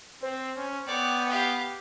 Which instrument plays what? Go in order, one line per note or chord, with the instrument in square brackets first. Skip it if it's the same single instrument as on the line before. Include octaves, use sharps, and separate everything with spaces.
[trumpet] C4 [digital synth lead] C5
[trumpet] C#4
[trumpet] B3 [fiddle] C#5 D5 [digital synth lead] G5
[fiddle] G4 F5